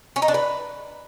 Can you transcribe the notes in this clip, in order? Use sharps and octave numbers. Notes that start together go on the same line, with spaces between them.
C#4
D#4
D4
B4